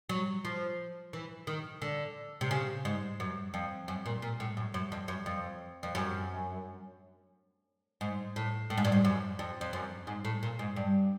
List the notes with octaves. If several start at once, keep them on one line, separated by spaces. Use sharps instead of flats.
F#3
F3
E3
D#3
D3
C3
C#3
G#2
F#2
F2
F#2
A#2
A#2
A2
F#2
F#2
F2
F#2
F2
F2
F#2
G#2
A2
A2
G#2
G2
G#2
F#2
F2
F2
F#2
G#2
A2
A#2
G#2
G2